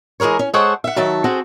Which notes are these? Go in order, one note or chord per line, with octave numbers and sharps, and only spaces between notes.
E3 G#3 G#4 A#4 C#5
C#4
G#3 G#4 A4 C5 C#5 F#5
E5 F#5
D#3 F#3 E5 A5
C4 F#4 G#4 A4 C5